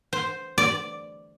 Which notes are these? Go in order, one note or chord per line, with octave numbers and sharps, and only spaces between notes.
C5
D5